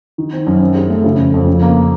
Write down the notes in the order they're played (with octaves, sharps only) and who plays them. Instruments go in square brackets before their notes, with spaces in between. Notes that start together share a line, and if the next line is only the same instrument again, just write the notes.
[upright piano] D#3
C4
F#2
C4
G#4
A3
C#3
F2
F2
C#3
A#3